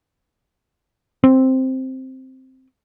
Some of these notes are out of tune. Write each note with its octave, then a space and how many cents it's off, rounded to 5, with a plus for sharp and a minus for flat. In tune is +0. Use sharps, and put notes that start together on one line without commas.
C4 +0